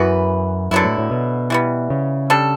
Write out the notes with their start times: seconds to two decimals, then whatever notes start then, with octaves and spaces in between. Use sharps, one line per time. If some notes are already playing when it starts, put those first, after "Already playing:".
Already playing: F#2 E3 B3 F#4 B4
0.71 F#2 D3 F#3 B3 E4
0.84 A2
0.98 A2
1.11 B2
1.50 E3 G3 B3
1.90 C#3
2.30 G3 D4 A4